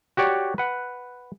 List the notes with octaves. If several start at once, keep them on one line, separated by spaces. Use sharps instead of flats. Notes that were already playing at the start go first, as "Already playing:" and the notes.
F#4 G4 C#5 D5
B4 F#5